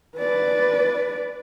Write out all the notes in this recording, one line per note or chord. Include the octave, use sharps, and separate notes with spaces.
B4 D5